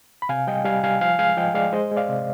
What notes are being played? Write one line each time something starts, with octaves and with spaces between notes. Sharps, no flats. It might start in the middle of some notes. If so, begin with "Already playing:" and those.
B5
C3 F5 G#5
G3 D#5 G5
G3 F5 G#5
G3 F5 G#5
F3 F5 G#5
G#3 F5 G#5
F3 D#5 G5
G#3 D5 F5
G#3 C5 D#5
G#3
D5 F5
C3